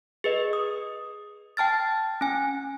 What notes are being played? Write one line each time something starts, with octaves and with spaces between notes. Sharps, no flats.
G#4 B4 D#5
D#6
G5 A5 F6 A6
C#4 G#5